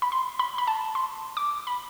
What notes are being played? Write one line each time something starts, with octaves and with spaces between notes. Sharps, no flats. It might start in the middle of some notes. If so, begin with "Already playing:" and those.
B5
C6
B5
B5
A5
C6
D6
B5